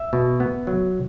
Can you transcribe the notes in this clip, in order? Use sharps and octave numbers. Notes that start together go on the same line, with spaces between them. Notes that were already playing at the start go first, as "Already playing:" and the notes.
Already playing: E5
B2
B3
F#3